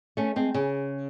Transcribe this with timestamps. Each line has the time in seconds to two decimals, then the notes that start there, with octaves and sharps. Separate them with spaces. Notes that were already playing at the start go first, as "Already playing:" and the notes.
0.17 A3 C#4
0.36 G#3 C4
0.54 C#3